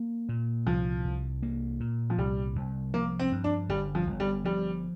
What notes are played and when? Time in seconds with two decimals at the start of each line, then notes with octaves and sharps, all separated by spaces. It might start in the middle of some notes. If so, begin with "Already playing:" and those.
Already playing: A#3
0.29 A#2
0.66 C2 F3
1.05 C2
1.43 A#3
1.80 A#2
2.10 F3
2.18 C2 G3
2.56 C2
2.94 F3 A#3
3.19 C4
3.32 G2
3.44 D4
3.69 G1 G3
3.95 F3
4.07 G1
4.20 G3
4.44 F3 G3